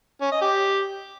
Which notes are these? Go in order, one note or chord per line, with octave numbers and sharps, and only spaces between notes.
C#4
D#5
G4